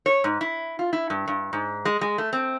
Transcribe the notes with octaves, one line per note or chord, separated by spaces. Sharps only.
C#5
G#2
E4
F4
E4
G2
G2
G#2
G#3
G#3
A3
C4